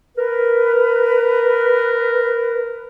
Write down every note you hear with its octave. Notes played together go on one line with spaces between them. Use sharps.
A#4 B4